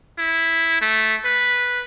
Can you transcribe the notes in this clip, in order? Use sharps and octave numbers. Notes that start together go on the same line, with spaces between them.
E4
A3
B4